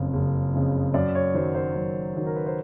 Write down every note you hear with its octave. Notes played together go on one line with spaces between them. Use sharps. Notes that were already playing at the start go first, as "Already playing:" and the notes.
Already playing: F#1 F2 C#3
F#1
F2 C#3
F#2 D5
C#5
D#3 F#3 C5
C5
F#2
D#3 F#3
A#4
B4
C5